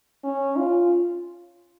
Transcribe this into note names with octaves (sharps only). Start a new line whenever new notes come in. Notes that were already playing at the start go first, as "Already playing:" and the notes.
C#4
F4